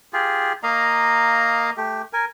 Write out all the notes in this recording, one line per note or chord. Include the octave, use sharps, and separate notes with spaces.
F4 G4 G#4
A#3 D#5 F5 A#5
A3 G4
A#4 G#5